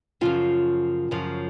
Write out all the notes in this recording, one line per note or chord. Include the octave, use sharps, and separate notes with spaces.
F#2 C#3 F3 F4
F#2 C#3 F3